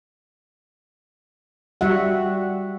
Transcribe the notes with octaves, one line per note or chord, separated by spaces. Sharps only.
G3 F#4 E5 F#5